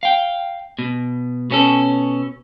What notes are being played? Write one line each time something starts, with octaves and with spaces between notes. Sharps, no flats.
F5 G5
B2
B2 C#4 A4